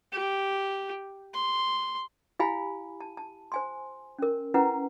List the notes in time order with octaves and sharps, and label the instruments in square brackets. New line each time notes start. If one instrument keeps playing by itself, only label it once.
[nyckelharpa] G4
C6
[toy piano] E4 G4 F5 G#5 B5
A5
A5
C5 G#5 C6
C#4 A#4
C#4 E4 B4 F#5 A#5